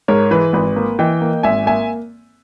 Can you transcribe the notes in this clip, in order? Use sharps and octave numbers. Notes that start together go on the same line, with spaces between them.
G#2 A#4 C#5
E3 B4
G#1 B4
A#3
E3 D#5 G5
A#3
G#1 E5 G#5
A#3 E5 G#5